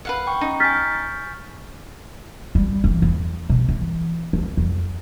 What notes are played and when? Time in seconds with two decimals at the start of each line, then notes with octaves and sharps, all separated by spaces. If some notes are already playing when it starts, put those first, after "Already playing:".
0.05 B4 F5 F#5
0.27 G5 C#6
0.41 C#4 D#4
0.60 G#5 C#6 F6 G6 A6 B6
2.55 G3
2.84 E3
3.02 E2
3.49 B2
3.69 E3
4.33 D#2
4.57 F2